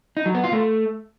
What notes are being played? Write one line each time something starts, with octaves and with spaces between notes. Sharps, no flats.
D#4
F#3
B3
F4
A3